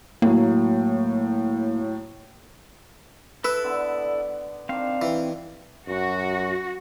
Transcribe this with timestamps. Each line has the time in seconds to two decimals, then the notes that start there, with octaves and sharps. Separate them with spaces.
0.22 A2 F#3 A#3
3.44 E4 A4 B4 E6
3.64 D3 B3
3.97 D5
4.69 D#3 C4 D4 F5
5.02 E3
5.88 F#2 F#4